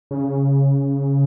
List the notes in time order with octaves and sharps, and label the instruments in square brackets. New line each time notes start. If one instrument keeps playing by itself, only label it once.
[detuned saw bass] C#3